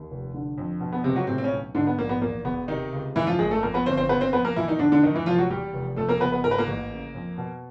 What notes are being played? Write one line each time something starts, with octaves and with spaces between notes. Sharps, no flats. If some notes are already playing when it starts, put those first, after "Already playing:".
Already playing: D#2
F1
D3
F2
B2
B3
C#2 C3 C4
F#3 F#4
A2 C3 C4
C4
C#3 C#4
B1
G#2 D3 D4
B3
A#1 A#3
B3
E2 A#3
E1 B3
C3 D#3 D#4
C#2
F#2 E3 E4
F3 F4
G#1 G#3 G#4
A3 A4
F2 A#3 A#4
B3 B4
G1 C4 C5
C4 C5
C#3 B3 B4
C4 C5
F2 B3 B4
A#3 A#4
B2 E3 E4
D#3 D#4
E2 D3 D4
D3 D4
F2 D#3 D#4
E3 E4
F1 F3 F4
F#3 F#4
E2 G3 G4
F1
F2 A3 A4
A#3 A#4
F#1 B3 B4
B3 B4
G#2 A#4
B4
A#3 A#4
A1
C#3
F2
B2